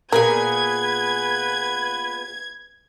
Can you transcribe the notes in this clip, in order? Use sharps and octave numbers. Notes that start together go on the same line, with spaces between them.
A#2 B3 G#4 A#4 B4 G#6